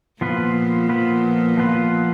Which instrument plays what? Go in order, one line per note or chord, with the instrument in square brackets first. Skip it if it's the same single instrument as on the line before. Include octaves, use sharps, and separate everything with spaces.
[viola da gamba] A#2 [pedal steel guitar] F3 B3 F4 B4
[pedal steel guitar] F3 B3 F4 B4
F3 B3 F4 B4